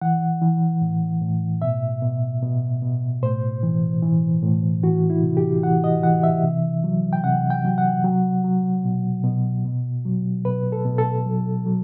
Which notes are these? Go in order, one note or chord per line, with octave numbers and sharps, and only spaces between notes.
E3 F#5
E3
A2
A2
B2 E5
B2
B2
B2
A2 C5
E3
E3
A2
E3 F#4
E4
C3
G4
E3 F#5
D#5
E3 F#5
E5
C3
F#3
G5
C3 F#5
G5
F#3
F#5
F#3
F#3
B2
B2
B2
F#3
B2 B4
A4
B2
A4
F#3
F#3